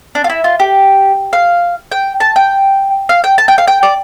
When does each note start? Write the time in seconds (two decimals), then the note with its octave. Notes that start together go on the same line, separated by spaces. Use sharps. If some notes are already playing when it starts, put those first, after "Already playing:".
0.15 D4
0.24 F4
0.30 E4
0.44 F4
0.60 G4
1.33 F5
1.92 G5
2.20 A5
2.36 G5
3.09 F5
3.24 G5
3.38 A5
3.48 G5
3.58 F5
3.68 G5
3.83 D5